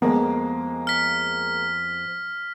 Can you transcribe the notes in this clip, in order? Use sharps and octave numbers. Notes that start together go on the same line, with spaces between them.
F2 G#3 A#3 B3
F6 B6